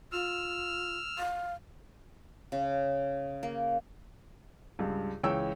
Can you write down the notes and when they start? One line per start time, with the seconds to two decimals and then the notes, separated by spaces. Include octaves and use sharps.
0.12 F4 E6 F6
1.19 F5
2.52 C#3
3.43 A#3
4.79 C#2 G2
5.24 C#2 E3 C#5 G5 E6